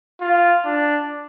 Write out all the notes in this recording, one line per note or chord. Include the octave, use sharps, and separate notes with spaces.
F4
D4